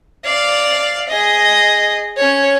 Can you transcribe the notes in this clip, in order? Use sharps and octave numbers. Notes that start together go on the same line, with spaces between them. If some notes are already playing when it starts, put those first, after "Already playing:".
D5 F5
G#4 D#5
C#4 C#5